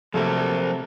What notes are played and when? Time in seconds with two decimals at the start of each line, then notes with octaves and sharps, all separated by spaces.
0.14 C3 F3 F#3 A3 A4 A#4 C5